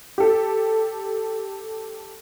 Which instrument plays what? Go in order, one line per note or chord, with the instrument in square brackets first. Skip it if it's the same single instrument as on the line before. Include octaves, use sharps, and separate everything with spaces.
[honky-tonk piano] G4 A4